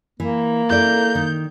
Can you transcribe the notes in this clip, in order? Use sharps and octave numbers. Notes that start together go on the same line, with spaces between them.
E3 A#3
E4 A4 D5 G6
D#3